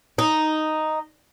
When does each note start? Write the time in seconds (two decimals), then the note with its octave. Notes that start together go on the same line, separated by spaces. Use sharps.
0.18 D#4